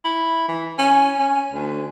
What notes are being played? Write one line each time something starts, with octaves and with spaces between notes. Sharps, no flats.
E4
E3
C#4
C#4
D2